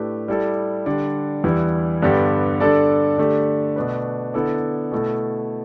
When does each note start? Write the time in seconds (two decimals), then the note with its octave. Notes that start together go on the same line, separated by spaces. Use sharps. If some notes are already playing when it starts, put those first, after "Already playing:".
Already playing: A2 A3 D4 G4 B4
0.28 G3 E4 A4 D5
0.86 D3 G3 D4
1.44 E2 E3 G3 E4
2.02 G2 D3 B3 G4 D5
2.60 D3 G3 D4 A4 D5
3.18 D3 A3 D4 G4
3.76 B2 A3 D4 B4
4.34 D3 B3 E4 A4 D5
4.92 B2 A3 E4 A4